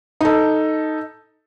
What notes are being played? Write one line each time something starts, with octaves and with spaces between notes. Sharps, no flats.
D#4 A4